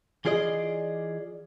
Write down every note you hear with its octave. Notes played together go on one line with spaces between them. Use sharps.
E3 F4 G#4 D5 D#5